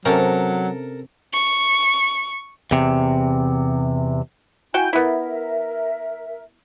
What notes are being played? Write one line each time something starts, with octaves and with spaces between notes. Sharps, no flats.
C3 F#3 C#4 A4 A#4
C#6
E2 C3
E4 F#4 G5 G#5 G6
B3 E4 A#4 E5